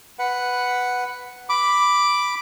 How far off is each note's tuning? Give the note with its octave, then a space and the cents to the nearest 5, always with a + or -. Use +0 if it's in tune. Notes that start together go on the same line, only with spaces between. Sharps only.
B4 +5 F#5 +0
B5 +0 D6 +0